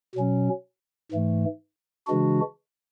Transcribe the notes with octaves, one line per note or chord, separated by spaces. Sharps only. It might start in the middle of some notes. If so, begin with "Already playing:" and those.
B2 F#3 C#4
G#2 E3 A3
C#3 E3 G#3 D4 F#4